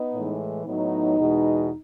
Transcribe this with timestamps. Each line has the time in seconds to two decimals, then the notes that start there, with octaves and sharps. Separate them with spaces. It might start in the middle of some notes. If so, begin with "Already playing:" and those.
Already playing: B3 D#4
0.14 A2 E3 G#3
0.66 A2 F#3 B3 D#4
1.18 E2 B2 G#3